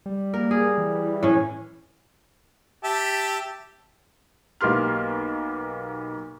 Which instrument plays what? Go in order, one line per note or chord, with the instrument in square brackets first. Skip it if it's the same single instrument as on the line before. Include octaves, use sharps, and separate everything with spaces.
[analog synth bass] G3
[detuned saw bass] A#3 [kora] A#4
[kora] G#4
[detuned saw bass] E3
[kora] A2 C#4
[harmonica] G4 E5 A5
[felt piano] B1 A#3 B3 G4 C6 F6